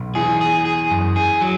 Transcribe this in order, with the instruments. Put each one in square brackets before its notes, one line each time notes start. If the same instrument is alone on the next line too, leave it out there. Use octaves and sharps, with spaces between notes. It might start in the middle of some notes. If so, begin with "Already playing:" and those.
Already playing: [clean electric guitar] B1
[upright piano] E2 [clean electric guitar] G#4
[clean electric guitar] G#4
G#4
F#2
G#4
F#3